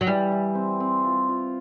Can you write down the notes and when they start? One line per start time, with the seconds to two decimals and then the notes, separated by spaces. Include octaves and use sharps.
0.01 F#3
0.07 E3 G3
0.32 E3
0.55 C4
0.80 C4
1.04 F4
1.29 F4